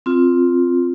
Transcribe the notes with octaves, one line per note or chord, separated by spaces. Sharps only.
C4 F4